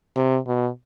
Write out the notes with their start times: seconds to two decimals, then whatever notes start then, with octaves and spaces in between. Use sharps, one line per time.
0.16 C3
0.47 B2